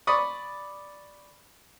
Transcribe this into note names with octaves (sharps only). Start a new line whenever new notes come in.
D5 B5 C#6 D#6